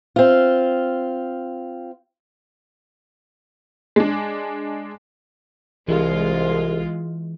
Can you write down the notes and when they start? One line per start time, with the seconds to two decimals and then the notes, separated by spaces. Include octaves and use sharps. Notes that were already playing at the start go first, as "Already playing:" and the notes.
0.16 C4 F4
3.96 G#3 D4
5.88 C2 E3 G#3 F4